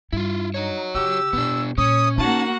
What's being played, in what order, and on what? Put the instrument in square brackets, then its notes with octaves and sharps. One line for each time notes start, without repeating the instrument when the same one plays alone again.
[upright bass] G2 [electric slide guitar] E4 F4
[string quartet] D#4 [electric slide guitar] F#4 C#5
[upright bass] C#3 [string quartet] G4 [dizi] E6
[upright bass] B2 [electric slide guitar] B3 D4
[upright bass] A#2 [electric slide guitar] C#4 [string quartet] C#5 [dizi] D#6
[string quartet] A#3 F#4 F#5 [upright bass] D#4 [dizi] A5